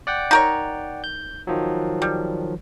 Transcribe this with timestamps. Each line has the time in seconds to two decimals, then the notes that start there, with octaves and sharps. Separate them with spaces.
0.07 D5 F#5 G5
0.31 D#4 A#4 C#5
1.04 G6
1.47 D#3 F3 F#3
2.02 G3